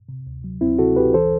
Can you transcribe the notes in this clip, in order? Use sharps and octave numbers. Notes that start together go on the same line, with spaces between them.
C3
D2
F#3
D2 C4 E4
C3 F#4 A4
D2 G4 B4
E3 A4 C5